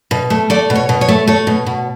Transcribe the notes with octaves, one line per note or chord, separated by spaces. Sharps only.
B2
A3
A3 D5
B2
C#5
B2
C#5
A3
A3 C#5
B2
B2